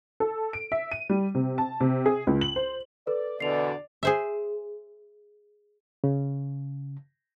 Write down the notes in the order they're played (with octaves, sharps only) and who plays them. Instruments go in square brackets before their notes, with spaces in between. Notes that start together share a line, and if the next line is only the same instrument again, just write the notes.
[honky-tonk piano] A4
D7
E5
D#7
G3
C3
A5
C3
G#4
C#2
F#7
C5
[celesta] A4 B4 [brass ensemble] D5
[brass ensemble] E2 B2 D3 [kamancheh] D5 [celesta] C7 F7
[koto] G#4 C5 E5
[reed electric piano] C#3